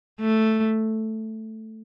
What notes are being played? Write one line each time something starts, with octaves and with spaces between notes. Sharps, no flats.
A3